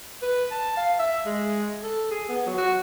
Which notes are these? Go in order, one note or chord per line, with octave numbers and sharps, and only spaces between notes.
B4
A5
F5
E5
G#3
A4
G#4
B3
F#3
F#4